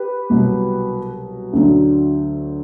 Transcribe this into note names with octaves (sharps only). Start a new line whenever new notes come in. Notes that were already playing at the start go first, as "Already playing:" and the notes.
Already playing: G4 B4
C2 B2 F#3
D2 D3 F#3